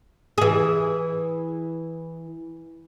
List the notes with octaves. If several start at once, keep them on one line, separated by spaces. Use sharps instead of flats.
E3 G#4